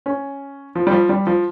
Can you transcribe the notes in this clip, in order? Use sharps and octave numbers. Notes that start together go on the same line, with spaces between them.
C#4
F3
G3
F3
G3
F3